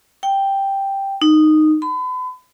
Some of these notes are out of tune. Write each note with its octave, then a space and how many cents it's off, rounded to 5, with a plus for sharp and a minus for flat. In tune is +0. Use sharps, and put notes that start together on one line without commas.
G5 +0
D#4 -10
B5 +40